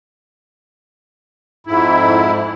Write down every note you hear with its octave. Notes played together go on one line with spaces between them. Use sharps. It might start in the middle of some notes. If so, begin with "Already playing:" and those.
F2 G#2 E4